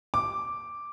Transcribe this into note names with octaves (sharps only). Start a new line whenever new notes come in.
D6